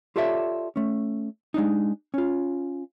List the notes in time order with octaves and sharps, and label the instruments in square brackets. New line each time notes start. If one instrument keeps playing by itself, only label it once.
[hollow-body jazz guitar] F4 G4 A4 C#5 D5 E5
A3 C#4
G#3 D4 D#4
C#4 F4